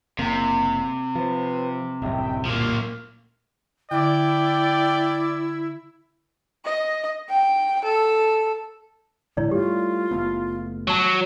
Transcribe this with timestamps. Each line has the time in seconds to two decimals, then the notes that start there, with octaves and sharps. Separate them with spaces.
0.19 F#1 C3 A#3
1.15 F3 B4 C5
2.02 D1 C2 F#2 D#5 E5 G5
2.45 A#2 F3 A#3
3.91 D3 E4 D5 G5 D6
6.64 D#5
7.29 G5
7.84 A4
9.37 D1 G#2 D3 E4 C#5 D5
9.51 G3 A3 F4 G4
10.11 F#1 A3 B3
10.88 F#3 A5 C#6